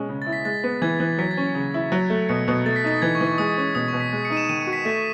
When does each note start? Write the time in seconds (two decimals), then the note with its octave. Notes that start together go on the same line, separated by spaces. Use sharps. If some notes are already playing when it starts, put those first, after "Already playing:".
Already playing: B2 G#3 C#4
0.09 C#3
0.22 A6
0.27 E4
0.33 B6
0.45 G#3 A6
0.64 B3
0.82 E3 G#6
1.00 E3
1.18 F#3 B6
1.31 A6
1.37 C#4
1.55 C#3
1.74 E4
1.92 F#3
2.10 A3
2.29 B2 C#7
2.48 B2
2.66 A3 A6
2.76 B6
2.84 D#4 A6
3.02 E3 G#6
3.15 C#6
3.21 E3
3.27 C#6
3.38 G#3 D#6
3.57 C#4
3.75 B2 D#6
3.88 C#6
3.93 B2
4.00 B6
4.13 G#3
4.25 C#7
4.30 D#4 D#7
4.37 E7
4.49 D#3 D#7
4.61 C#7
4.67 F#4
4.73 B6
4.85 A3 B6